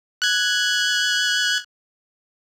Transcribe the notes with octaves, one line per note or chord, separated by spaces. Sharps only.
F#6 G#6